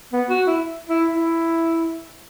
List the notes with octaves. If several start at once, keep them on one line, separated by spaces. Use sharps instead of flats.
B3
F#4
E4
E4
E4